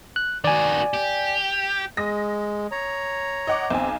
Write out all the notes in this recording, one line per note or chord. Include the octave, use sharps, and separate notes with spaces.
F#6
D#3 F#4 D5 G#5
G4
G#3 D#6 A#6
C#5 A#5
D#5 F#5 D6
B1 C4 G#5